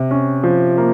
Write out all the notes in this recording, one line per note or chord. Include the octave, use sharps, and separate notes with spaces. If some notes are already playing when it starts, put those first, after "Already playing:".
Already playing: C3
C#4
F3
A#3